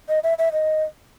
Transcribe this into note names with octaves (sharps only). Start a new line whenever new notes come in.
D#5
E5
E5
D#5